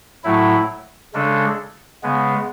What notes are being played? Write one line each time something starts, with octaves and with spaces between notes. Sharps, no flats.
A2 F#3 A3 E4
C#3 G#3 D4 A4
C#3 G#3 B3